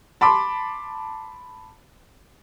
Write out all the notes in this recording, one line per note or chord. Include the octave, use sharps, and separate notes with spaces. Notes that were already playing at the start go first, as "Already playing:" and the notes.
A5 B5 C6 D6